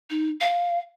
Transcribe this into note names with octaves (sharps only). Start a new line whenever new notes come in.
D#4
F5